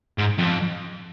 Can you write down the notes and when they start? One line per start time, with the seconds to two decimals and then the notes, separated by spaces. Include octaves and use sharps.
0.18 G#2
0.39 F2